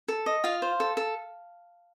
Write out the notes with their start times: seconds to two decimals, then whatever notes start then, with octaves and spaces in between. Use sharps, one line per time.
0.08 A4
0.26 D#5
0.44 F4 F5
0.62 C5
0.80 A4
0.97 A4